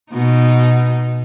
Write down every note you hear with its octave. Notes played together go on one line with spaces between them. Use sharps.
B2 D#4